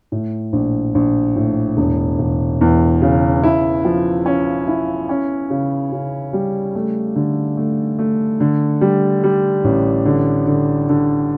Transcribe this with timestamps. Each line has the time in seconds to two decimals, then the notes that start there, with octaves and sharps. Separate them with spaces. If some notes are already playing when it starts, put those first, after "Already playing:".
0.12 A2
0.53 A#1
0.95 A#1
1.36 A2
1.77 E1
2.19 E1
2.61 E2
3.02 C#3
3.43 E4
3.85 F3
4.26 C#4
4.67 E4
5.09 C#4
5.50 C#3
5.92 C#3
6.33 G3
6.75 A3
7.16 D3
7.57 A3
7.99 A3
8.40 D3
8.81 G3
9.23 G3
9.64 A1
10.06 D3
10.47 D3
10.89 D3